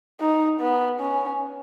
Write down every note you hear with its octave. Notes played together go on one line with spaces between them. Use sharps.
D#4
B3
C#4